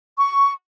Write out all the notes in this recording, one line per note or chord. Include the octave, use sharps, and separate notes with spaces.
C#6